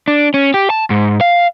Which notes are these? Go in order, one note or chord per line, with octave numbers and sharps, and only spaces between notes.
D4
C#4
G4
A5
G#2
F5